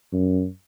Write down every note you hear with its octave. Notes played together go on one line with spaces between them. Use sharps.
F#2